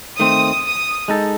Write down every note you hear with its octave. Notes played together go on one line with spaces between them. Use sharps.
D#3 A3 C4 D#6
D#6
G#3 D#4 A4